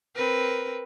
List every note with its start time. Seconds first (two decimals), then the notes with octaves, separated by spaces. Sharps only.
0.16 C4 A#4 B4